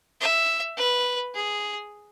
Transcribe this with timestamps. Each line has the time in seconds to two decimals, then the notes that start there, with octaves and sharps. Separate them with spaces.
0.21 E5
0.77 B4
1.35 G#4